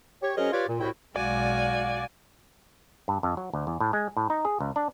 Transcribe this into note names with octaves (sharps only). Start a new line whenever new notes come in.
G4 C#5
F#3 C#4 G#4 A#4 C5 D#5
F4 G4 B4 C#5 D5
A#2
C2 A2 E4 F#4 G5
B1 G#3 F#4 D5 F5 G#5
G2
F2
F#3
D2
E2
A2
G#3
A2
D#4
G#4
C#2
D4